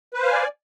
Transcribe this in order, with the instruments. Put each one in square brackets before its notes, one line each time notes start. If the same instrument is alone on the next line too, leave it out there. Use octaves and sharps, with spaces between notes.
[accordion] B4
C5
F5
G#5
D5